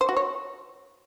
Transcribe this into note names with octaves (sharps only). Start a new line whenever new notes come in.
C5
F#4
C#5